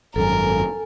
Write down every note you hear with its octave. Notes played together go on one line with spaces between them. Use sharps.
G#1 F#2 A4 A#4 G#5